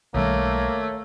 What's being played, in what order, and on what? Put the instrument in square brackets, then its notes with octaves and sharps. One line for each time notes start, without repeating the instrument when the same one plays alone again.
[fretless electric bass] B1 D#3 G3 [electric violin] A3 [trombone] A#3 [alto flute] C#5